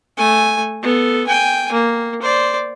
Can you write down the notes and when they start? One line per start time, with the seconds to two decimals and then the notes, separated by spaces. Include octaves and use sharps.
0.17 A3 G#5
0.83 B3 A4
1.27 G5 G#5
1.72 A#3
2.22 C5 D5